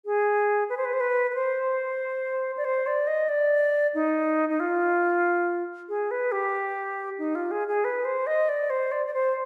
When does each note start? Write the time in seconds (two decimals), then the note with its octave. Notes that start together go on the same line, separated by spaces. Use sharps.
0.05 G#4
0.69 B4
0.77 C5
0.85 B4
0.93 C5
1.00 B4
1.31 B4
1.35 C5
2.57 D5
2.65 C5
2.87 D5
3.07 D#5
3.29 D5
3.94 D#4
4.49 D#4
4.60 F4
5.89 G#4
6.11 B4
6.32 G4
7.18 D#4
7.35 F4
7.51 G#4
7.68 G#4
7.84 B4
8.05 C5
8.27 D#5
8.49 D5
8.70 C5
8.92 D5
9.06 D5
9.14 C5